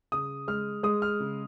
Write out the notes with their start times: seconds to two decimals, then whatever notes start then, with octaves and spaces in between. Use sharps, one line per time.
0.12 C#3 D#6
0.48 G#3 F6
0.83 G#3 D#6
1.02 F6
1.20 C#3